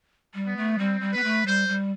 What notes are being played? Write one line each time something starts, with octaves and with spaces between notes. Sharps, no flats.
G3
B3
A3
G3 C4
G3
B3 B4
A3
G3 C5
G3